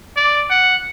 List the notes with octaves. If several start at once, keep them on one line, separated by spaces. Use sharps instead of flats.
D5
F#5